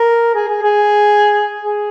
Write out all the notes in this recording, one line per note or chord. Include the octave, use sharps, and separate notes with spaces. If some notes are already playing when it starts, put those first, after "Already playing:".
Already playing: A#4
G#4
G#4
G#4
G#4